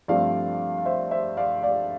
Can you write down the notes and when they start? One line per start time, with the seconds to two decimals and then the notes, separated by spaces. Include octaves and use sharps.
0.08 G2 F3 A3 C4 D5 F5
0.78 F5
0.86 C5 E5
1.11 C5 E5
1.37 D5 F5
1.63 D5 F5